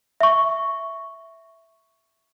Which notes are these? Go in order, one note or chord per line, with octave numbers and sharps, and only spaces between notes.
E5 C#6